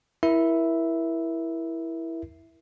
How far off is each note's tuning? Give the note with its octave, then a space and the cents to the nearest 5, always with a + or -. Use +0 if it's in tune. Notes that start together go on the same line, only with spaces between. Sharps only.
E4 +0 A#4 +25 E5 +0